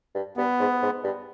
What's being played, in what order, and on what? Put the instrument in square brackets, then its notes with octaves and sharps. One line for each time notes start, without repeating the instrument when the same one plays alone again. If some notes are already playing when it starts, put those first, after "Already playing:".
[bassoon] G2
[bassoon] G2 [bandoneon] B3
[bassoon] G#2
G#2
G2